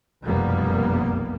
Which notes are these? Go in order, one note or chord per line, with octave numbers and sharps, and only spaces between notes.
F1 B1 F#2 G3 A#3 B3